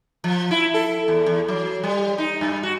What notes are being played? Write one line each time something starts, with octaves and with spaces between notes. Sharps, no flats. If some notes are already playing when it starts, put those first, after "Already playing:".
F3
E4
A4
E2
E2
F#3
G3
D#4
G2
F#4